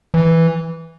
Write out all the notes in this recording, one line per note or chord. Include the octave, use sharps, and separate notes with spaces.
E3